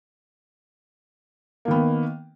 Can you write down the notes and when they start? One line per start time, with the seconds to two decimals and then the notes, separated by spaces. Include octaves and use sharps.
1.65 A#3
1.68 D#3
1.71 B3